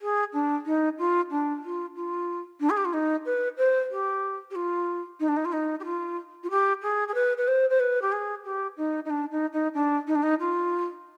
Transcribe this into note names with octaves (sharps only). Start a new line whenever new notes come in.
G#4
D4
D#4
F4
D4
F4
F4
D4
G#4
G4
F4
D#4
B4
C5
G4
G4
F4
D#4
D4
D#4
F4
D#4
G4
F4
F4
G4
G#4
G#4
B4
B4
C5
C5
B4
G4
G#4
G4
D#4
D#4
D4
D#4
D#4
D4
D#4
D4
D#4
F4